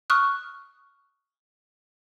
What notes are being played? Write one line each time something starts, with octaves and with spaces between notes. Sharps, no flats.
C#6 D#6 F6 F#6